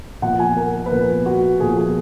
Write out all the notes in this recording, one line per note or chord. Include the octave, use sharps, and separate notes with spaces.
A#2 F3 B3 F4 F#5
G#5
A#4
B4
A#2 F3 B3 F4 A#4
F#4
A#2 F3 B3 F4 G#4
G#4